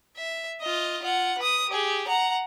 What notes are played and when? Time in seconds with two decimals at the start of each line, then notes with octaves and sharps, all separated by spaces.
0.17 E5
0.60 F4 D#5
1.02 F4 F#5
1.38 B4 D#6
1.69 G4 G#4
2.07 F#5 A#5